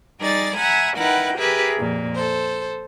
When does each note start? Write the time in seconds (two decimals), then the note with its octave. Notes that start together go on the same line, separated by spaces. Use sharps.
0.20 G3 D#4 G#4 D5 A6
0.55 E5 F#5 G#5 A#5 B5
0.97 D#4 E4 A#4 B4 F#5 G5
1.37 G4 G#4 A#4 B4 E5
1.77 F2 A#2
2.14 A4 C5